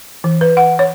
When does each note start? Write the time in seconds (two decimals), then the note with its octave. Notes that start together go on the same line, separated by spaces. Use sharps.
0.24 E3
0.41 B4
0.57 F#5
0.79 C#5